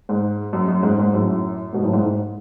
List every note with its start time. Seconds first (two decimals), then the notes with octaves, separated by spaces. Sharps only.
0.09 G#2
0.53 F#2
0.68 F#2
0.83 G#2
0.99 G#2
1.13 F#2 A2
1.73 G#2 B2
1.83 F#2 A2
1.93 G#2
2.04 G#2